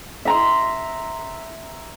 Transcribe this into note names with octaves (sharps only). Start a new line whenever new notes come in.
E5 A#5 C6